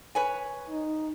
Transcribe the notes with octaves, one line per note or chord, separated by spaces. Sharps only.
B4 C#5 G#5
D#4